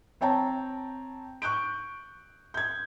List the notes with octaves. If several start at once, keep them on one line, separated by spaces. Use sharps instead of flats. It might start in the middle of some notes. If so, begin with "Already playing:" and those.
C4 C#5 G5 A5 A#5
C#6 F#6 G6 D7
G6 G#6